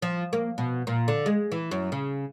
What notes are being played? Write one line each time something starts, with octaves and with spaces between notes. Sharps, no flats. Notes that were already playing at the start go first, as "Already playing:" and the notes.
F3
A#3
B2
A#2
D3
G#3
E3
F#2
C#3